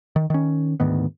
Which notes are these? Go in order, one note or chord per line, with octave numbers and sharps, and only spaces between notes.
D#3
D#3 C#4
D2 G#2 D#3 B3